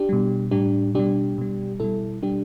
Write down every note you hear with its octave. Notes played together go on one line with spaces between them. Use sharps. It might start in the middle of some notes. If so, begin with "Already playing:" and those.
Already playing: D4 G4
B2 G3
A2 G3 D4 G4
B2 G3 D4 G4
B2 G3
B2 G3 E4 A4
B2 G3 D4 G4